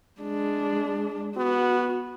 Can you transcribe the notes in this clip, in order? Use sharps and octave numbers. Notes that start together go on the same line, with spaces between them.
G#3 D4
B3 F#4